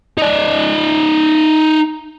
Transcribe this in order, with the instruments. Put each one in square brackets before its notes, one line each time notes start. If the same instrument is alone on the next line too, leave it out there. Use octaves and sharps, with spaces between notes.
[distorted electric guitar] D#4 D5